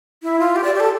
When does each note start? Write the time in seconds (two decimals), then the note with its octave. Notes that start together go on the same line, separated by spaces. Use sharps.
0.23 E4
0.39 F4
0.56 G4
0.64 D5
0.74 G4
0.80 A4